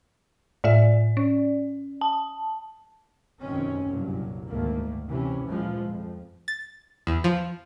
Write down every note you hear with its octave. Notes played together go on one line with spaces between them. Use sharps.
A2 F4 D5 E5
C#4
A5
F1 F#2 B2 D#3 C4 C#4
F#1 C2 G2 A#2 F#3
D2 G#2 D#3 A3 A#3
C3 E3 C#4
A#2 E3 F3 G#3
F2
A6
E2
F3